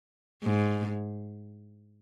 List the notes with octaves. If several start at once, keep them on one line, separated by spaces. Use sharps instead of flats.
G#2